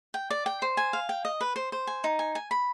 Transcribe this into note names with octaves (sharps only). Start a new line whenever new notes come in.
G5
D5
G5
C5
G#5
F5
G5
D#5
B4
C5
C5
G#5
D#4
G#5
G#5
B5